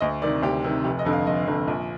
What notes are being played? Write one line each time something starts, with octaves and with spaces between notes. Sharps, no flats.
D2 D#5
C3 D#3 D5
D2 G4
C3 D#3
F1 G4
D#5
F2 D3
F5
F1 D#5
F2 D3
A#1